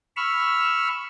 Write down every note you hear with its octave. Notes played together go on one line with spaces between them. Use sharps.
B5 C#6 E6 F6